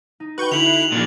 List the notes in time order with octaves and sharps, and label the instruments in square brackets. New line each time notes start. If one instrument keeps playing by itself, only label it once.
[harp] D#4
[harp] F#4 G5 [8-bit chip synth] B4 C#6 G6
[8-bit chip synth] D3 E4 [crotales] F7 F#7
[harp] F#6 C7
[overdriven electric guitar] A#2 F3 [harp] C6 G#6 C#7